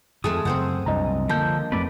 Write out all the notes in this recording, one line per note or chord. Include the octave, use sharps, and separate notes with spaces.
F2 G#3 A3 G#4 D#6
F#2 C#3 C4 C5 F#5
C2 F#2 D4 D#5 A#5
D3 F3 A#3 A5 G6
F2 A3 C4 B4 D5